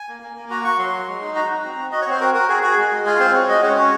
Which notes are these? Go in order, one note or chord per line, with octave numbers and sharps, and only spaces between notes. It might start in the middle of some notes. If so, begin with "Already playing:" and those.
Already playing: G#5
A#3
A#3
A#3
F#4 A#5
F#4 C#6
F#3 C6
F#4
G#3
D#4
F#4 A#5
F#4
C4
F#4
F#4 D#5
C#5
C4 C5
F#4 A#4
F#4 A#4
F#4 G#4
F#4 G#4
G#3
G#3
F4 G#4
C4 C5
F#4 C#5
G#3 D#5
C#4 C#5
F#4 C#5